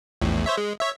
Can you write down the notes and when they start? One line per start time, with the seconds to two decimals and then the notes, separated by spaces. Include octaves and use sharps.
0.21 A#1 E2 A2
0.46 C5 C#5 E5
0.57 G#3
0.80 C#5 E5